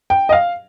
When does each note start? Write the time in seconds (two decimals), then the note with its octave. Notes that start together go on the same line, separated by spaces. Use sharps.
0.10 G5
0.29 D#5
0.32 F5